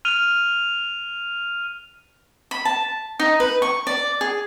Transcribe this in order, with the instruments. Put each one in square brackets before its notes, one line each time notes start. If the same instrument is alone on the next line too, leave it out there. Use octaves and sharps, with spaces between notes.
[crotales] F6 D#7 F7
[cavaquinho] B5
A5
D#4
B4
C#6
D5
G#4